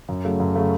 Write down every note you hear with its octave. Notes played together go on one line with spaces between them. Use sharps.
F#2
C#3 F#3 A3
F#2
C#3 F#3 A3